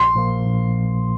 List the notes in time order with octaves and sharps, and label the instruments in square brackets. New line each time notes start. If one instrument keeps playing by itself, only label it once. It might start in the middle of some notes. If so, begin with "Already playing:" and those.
Already playing: [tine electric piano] A#1 [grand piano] C6
[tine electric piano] A#2 F3 A#3
A#1